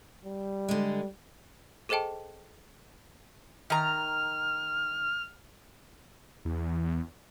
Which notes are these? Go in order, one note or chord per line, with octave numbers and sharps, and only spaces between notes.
G3
D3 G#3
G#4 A4 C5 D#5 G5 A5
D#3 A#5 F6
E2